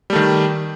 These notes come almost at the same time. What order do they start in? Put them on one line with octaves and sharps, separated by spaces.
G3 A3 D#3